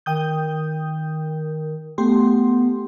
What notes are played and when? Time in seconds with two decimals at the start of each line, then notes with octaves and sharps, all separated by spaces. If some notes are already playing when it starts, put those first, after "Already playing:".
0.06 D#3 G5 D#6 G6
1.98 A3 B3 G4 C6